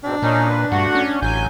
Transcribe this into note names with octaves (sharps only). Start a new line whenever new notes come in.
G#2 B2 C4 D4
A#2 C#4 D#4
B4
G2 A3 F#4 F#5
C#4
A1 F#3 G#5 G6